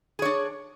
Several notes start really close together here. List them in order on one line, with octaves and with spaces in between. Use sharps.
G#4 C#5 D4